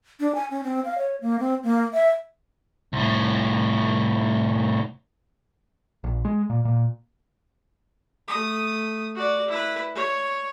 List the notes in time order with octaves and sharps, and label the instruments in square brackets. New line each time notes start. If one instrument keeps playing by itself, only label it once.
[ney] D4
G#5
C#4
C4
F5
C#5
A#3
C4
A#3
E5
[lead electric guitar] C2 A2
[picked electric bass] A#1
G#3
A#2
A#2
[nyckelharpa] A3 D#6
F#4 D5
E4 B4
C#5